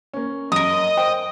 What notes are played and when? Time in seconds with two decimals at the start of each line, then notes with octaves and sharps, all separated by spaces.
0.13 A#3 C#4
0.52 F#2 A#4 D#5 D#6
0.97 C5 G5